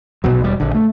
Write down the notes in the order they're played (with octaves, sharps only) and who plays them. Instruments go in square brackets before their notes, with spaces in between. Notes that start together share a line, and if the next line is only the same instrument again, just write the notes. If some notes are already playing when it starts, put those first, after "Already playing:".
[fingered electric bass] B1 B2 F#3
E1 G3
A#1 D3
A3